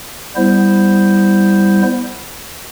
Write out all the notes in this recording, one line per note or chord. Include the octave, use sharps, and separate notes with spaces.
G3 B3 E4 C5